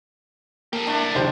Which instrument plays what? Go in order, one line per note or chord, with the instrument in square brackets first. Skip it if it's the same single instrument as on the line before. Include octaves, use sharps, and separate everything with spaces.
[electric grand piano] A#3 [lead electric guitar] G4 A4
[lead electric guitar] D2 E4 [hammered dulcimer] D4 A5
[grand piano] F#1 G4 C5 [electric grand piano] D#3